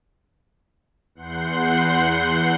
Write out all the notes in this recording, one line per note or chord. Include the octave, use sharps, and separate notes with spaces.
E2 F#5 C6 G6